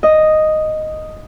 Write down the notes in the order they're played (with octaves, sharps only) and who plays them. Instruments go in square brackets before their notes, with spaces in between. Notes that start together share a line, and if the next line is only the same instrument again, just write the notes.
[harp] D#5